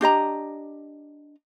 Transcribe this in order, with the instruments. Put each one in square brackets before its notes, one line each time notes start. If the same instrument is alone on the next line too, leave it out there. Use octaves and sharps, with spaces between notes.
[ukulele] D4 G4 D#5 A#5